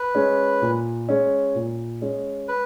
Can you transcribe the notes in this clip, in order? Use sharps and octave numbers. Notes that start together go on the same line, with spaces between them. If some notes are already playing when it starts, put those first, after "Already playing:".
Already playing: B4
G#3 C#4
A#2
G#3 C#4
A#2
G#3 C#4
B4